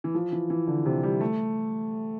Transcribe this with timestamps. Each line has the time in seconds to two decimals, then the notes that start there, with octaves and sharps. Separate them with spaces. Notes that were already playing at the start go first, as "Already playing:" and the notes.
0.04 E3
0.15 F3
0.32 E3
0.50 E3
0.67 D3
0.86 C3
1.03 G3
1.21 A3